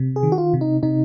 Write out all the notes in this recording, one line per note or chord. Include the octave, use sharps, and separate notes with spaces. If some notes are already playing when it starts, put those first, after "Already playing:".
Already playing: C3
G#4
D#3
F#4
F4
C3
D#4
C3 D#4